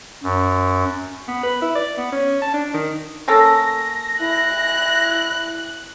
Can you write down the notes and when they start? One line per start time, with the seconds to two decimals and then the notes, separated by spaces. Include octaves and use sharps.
0.23 F#2
1.28 B3
1.43 B4
1.62 E4
1.75 D5
1.97 B3
2.12 C#4
2.42 A5
2.54 D4
2.74 D#3
3.28 A#3 C#4 A4 A#6
4.21 E4 F#6